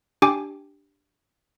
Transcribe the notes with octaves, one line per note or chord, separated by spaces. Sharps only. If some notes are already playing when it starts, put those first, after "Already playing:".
D4 G4 G5 G#5 D6